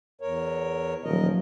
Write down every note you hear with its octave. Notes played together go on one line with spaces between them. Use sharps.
E2 A#4 C#5
D#1 F3 F#3 A#4 D#5